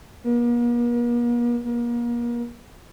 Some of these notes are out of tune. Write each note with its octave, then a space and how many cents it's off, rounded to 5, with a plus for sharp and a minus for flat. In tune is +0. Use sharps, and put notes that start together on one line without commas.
A#3 +45
A#3 +35